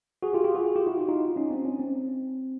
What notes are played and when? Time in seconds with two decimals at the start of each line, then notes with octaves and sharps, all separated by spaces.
0.23 F#4 G#4
0.33 F4 G4
0.44 F4 G4
0.55 F#4 G#4
0.76 F4 G4
0.86 E4 F#4
0.98 D#4 F4
1.09 D#4 F4
1.36 C#4 D#4
1.51 C4 D4
1.65 C#4
1.80 C4